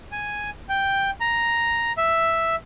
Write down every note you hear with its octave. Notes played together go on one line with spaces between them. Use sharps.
G#5
G5
A#5
E5